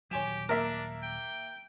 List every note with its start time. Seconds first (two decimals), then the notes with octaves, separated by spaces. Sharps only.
0.11 D#1 F#3 G4 C#5 G#5 E7
0.49 A#3 D4 A#4 E5 B6
1.03 G5